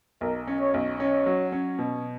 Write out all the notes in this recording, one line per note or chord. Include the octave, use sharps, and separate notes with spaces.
B1 A#4
C#4
C#5
B1
C#4 C#5
F#3
C#4
B2